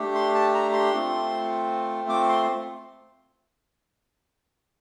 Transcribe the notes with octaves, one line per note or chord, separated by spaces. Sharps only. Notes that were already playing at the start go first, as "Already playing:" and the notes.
Already playing: A3 D4 G4
C6
A5
A#5
C6
A3 C4 F4
D6
C6